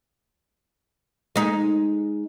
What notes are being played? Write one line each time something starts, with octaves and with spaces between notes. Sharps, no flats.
G#3 D#4